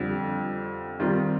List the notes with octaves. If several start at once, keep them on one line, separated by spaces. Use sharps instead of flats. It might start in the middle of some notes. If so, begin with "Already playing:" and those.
Already playing: F2 D3 G3
D#3 G3 C4 F4